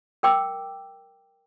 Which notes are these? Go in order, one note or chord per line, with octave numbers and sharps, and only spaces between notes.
A#4 G5 D6 E6